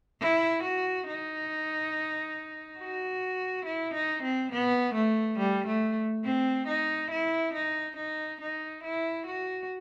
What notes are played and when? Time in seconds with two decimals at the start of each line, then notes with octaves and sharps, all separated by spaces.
0.21 E4
0.63 F#4
1.07 D#4
2.79 F#4
3.65 E4
3.94 D#4
4.23 C4
4.52 B3
4.95 A3
5.39 G3
5.67 A3
6.25 C4
6.67 D#4
7.11 E4
7.54 D#4
7.97 D#4
8.41 D#4
8.84 E4
9.27 F#4